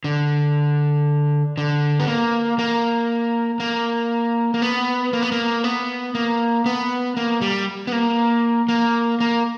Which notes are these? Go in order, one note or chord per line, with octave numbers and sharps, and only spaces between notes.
D3
D3
B3
A#3
A#3
A#3
A#3
B3
A#3
B3
A#3
B3
A#3
B3
A#3
G3
B3
A#3
A#3
A#3